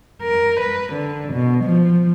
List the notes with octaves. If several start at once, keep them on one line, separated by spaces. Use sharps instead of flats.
A#4
B4
D3
B2
F3